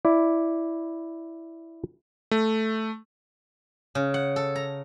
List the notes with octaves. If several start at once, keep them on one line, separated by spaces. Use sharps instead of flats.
E4 D5
A3
C#3
F#5
A4
A#5